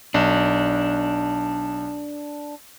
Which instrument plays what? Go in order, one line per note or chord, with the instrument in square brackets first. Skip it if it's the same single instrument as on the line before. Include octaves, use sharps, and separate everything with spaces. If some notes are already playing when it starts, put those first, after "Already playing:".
[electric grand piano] B1 [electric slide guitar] D4